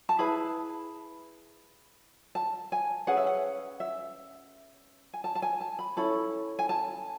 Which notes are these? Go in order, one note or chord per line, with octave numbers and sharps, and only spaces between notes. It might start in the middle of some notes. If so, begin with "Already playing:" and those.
A5
E4 G#4 B4 B5
A5
G#5
C#4 G#4 B4 F#5
E5
F#5
E5
G#5
A5
A5
G#5
A5
B5
C#4 E4 A4 B5
G#5
A5